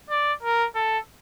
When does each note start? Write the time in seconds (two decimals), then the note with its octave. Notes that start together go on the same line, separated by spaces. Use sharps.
0.10 D5
0.43 A#4
0.75 A4